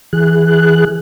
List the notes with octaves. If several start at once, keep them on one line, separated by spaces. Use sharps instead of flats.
E3 G#4 F#6